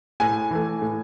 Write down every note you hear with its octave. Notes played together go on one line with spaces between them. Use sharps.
A2 G#5
E3 A3
A2